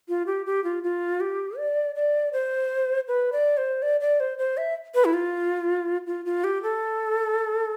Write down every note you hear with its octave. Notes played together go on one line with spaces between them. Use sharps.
F4
G4
G4
F4
F4
G4
D5
D5
C5
B4
D5
C5
D5
D5
C5
C5
E5
B4
E4
F4
F4
F4
G4
A4